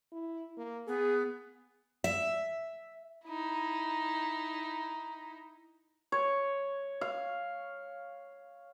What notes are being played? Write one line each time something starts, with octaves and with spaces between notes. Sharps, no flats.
E4
A#3
B3 G#4
E5
D#4 E4
C#5
F5